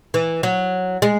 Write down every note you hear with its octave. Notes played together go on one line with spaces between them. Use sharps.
E3
F#3
G#3